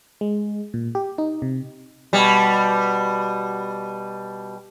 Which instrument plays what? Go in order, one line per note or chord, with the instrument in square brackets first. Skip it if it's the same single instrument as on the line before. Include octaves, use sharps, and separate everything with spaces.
[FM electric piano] G#3
A#2
G4
D#4
C3
[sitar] B2 G3